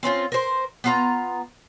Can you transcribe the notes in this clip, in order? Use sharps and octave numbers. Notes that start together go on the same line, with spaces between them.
C4 C#4 D#4 F4
A#4 C5
B3 F4 A#5